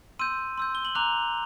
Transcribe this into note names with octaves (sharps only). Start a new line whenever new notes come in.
C6 E6 G6 D#7
C6 E6 G6
G7
F#7
A#5 D6 F#6 F7